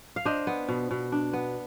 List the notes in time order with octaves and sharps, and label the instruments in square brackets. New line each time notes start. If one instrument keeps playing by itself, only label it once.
[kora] F5
D4 C5 D#5
B3
B2
B2
D4
B3